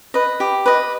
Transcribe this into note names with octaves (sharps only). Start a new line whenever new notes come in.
B4 D#5
G4
B4 D#5